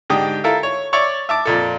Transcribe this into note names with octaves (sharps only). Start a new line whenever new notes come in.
G#2 D3 G4 D#5 G5
E4 F4 A4 A#4 E5 F5
C#5
C#5 D5 E5 C#6 D6
E5 A5 D6
F2 A#2 A4